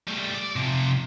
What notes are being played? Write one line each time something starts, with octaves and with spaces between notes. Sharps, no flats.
G3 A3
D5
C3 F3